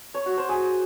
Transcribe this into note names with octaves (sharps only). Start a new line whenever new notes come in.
C#5
F#4
C5
G#4